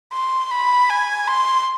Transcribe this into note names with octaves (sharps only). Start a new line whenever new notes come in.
C6
B5
G#5
C6